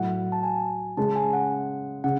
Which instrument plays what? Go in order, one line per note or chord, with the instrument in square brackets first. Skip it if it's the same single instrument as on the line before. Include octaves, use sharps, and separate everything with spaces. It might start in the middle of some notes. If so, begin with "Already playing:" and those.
Already playing: [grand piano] A2 F#3 A3 [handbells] F#5
[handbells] A5
G#5
[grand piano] C#3 G#3 C#4 [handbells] A5
[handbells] G#5
F#5
[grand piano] C#3 [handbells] F#5